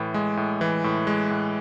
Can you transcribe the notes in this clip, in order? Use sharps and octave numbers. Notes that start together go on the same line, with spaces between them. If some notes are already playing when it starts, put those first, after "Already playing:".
Already playing: A2 E3
G#3
A2
E3
A2
G#3
A2